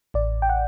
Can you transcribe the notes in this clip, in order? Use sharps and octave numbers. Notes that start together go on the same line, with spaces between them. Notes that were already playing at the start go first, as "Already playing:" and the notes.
A1 D5
G5
F#5